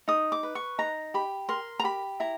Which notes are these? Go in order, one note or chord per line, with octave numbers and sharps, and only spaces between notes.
D#4 D#6
D6
B4
C#6
D#4 A#5
G4 B5
A#4 C6
A#5
G4 B5
E4 A#5